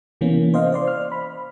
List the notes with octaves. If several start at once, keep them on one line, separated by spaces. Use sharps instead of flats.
C3 E3 A#3 B3 C#4
C5 D#5 F5
C5 D5 C6
F6
B5